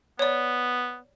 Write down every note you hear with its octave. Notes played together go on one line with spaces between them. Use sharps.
B3 C#5 D5